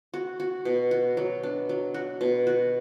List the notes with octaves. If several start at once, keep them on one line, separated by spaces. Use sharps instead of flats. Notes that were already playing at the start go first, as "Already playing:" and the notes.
F#4
F#4
B2
F#4
F#3
D4
F#3
F#4
B2
F#4